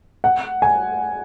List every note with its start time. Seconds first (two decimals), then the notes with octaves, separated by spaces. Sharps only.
0.24 F#5
0.62 G#5